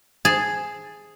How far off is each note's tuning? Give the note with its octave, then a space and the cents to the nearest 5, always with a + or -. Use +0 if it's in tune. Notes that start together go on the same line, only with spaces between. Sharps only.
G#4 +0 A5 +0